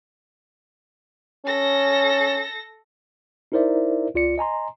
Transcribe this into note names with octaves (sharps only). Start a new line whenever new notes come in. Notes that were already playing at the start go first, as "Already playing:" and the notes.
C#4 A4 A#6
D#4 E4 A#4 C5 D5 E5
C#2 F4 D5 C#7
D#5 G#5 A#5 C6